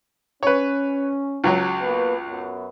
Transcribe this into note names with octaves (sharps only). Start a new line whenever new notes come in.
C#4 B4 C#5
C#2 F#3 C#5
A#3 B3 B4
F#2 B3